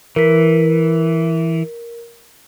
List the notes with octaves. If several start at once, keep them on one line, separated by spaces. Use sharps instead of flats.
E3 A#4 B6